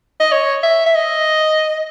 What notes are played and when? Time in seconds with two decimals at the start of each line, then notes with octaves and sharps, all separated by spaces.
0.20 D#5
0.32 C#5
0.63 E5
0.86 E5
0.95 D#5